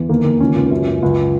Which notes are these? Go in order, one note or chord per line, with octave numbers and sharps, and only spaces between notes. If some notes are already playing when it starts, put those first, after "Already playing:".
Already playing: E2
D#2 A#3
D#2
C#2 C#4
C#2
F#2
F#2
C#2